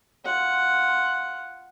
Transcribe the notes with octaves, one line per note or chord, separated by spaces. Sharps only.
F4 F#5